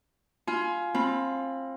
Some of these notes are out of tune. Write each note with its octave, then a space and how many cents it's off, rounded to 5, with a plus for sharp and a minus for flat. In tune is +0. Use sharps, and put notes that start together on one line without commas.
F4 +0 G#5 +25 B5 +20
C4 +30 F4 +0 B5 +0